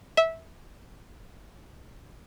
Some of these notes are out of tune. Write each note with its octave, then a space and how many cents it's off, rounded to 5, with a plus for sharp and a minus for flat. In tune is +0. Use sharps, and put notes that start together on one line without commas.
E5 -15